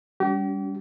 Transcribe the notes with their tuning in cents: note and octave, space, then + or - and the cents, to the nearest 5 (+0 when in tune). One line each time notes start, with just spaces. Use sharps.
G3 +10 C#4 +40 G4 -40